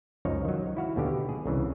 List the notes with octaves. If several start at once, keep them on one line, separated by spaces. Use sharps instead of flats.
C#2 F#2 F3 D#4 A#4 C#5
D#3 F#3
E4 F#4 F5
D#2 B2 D3 G4
G#4
C2 C#3 E3